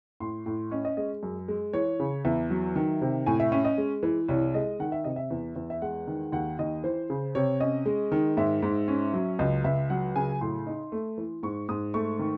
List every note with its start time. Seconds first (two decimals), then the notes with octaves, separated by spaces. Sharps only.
0.20 A2 C6
0.46 A2
0.71 C#4 D#5
0.85 D#5
0.97 G#3 D#5
1.23 F#2
1.48 G#3
1.73 E3 C#5
2.00 C#3
2.25 E2 E5
2.50 F#3
2.76 D#3
3.01 C3
3.26 A2 G#5
3.40 E5
3.52 C#4 E5
3.65 D#5
3.78 G#3
4.03 E3
4.29 C2 C#5
4.54 G#3 D#5
4.80 D#3 F#5
4.92 E5
5.04 C3 D#5
5.16 E5
5.31 E2
5.56 E2
5.70 E5
5.82 G#3 F#5
6.07 D#3
6.32 D#2 F#5
6.59 D#2 D#5
6.83 E3 C5
7.10 C#3
7.35 C3 C#5
7.60 C#4 D#5
7.86 G#3
8.12 D#3
8.37 G#2 E5
8.63 G#2
8.88 C#4
9.13 F#3
9.39 C#2 D#5
9.64 C#2 E5
9.90 F#3 F#5
10.16 C#3 G#5
10.41 A2 C6
10.67 D#4
10.92 A3
11.18 E3
11.43 G#2 C#6
11.69 G#2 D#6
11.94 A3 C#6
12.19 D#3